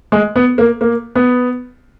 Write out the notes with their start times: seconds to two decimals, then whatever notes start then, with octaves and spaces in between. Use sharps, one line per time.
0.12 G#3
0.36 B3
0.58 A#3
0.81 A#3
1.15 B3